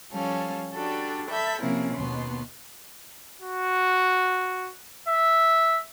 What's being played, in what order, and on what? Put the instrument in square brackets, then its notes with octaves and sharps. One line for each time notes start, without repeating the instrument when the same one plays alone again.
[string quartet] F3 G3 C#4 A4 F5
G3 D4 F#4 A4
A4 E5 B5 G6
C3 F3 A#3 C4 C#4 E4
D#2 B2 B3 C6
[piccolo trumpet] F#4
E5